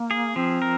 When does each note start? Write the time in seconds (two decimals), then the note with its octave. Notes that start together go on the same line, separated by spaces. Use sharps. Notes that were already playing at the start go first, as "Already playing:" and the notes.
Already playing: A#3
0.11 G#4
0.36 F3 C4
0.62 A#4